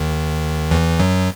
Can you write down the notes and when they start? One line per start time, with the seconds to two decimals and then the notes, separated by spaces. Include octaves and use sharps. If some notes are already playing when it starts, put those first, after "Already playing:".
Already playing: D#2 D#3
0.71 E2 E3
1.00 F#2 F#3